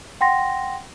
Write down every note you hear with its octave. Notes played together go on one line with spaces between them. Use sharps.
F#5 G5 C6 A#6